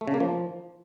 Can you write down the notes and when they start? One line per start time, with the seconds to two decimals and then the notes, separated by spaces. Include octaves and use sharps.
0.01 A3
0.08 C#3
0.14 A#3
0.20 F3